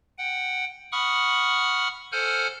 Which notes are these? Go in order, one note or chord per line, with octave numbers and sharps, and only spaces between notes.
F#5 G5
F#5 B5 C#6 D#6 F6
A4 C5 F#5 G#5 F6 G6